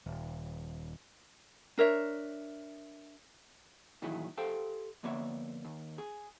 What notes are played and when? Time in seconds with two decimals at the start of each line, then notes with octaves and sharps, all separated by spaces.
0.06 D#1
1.78 D4 A#4 C#5 E5
4.02 A#2 D#3 E3 F#3 E4 G#4
4.37 G4 A4 C5 F5 G5
5.03 F2 D3 A#3 B3 C#5 E5
5.65 D#2
5.98 G#4